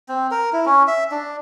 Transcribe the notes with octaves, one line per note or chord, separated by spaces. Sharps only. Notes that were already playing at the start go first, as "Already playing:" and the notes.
C4
A#4
E4
C#4
E5
D4